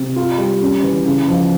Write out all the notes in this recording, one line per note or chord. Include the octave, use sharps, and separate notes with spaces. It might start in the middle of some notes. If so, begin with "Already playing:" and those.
Already playing: C3
F4
G3
C#4
E3
C#3
F3